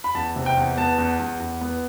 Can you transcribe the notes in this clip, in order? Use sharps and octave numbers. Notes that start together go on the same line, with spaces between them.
B5
E2 A5
C3
G5
E2
B3 A5
E2
E2
E2
B3